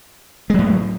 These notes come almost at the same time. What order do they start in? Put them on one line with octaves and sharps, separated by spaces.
G#3 F#3 A2